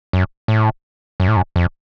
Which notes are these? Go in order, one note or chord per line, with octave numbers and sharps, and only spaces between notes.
F#2
A2
F#2
A2
F#2
F2